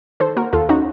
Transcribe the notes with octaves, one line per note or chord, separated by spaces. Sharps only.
D#3 A4 C5
A#3 F#4 A#4
D#2 F4 A4
C#4 D#4 F#4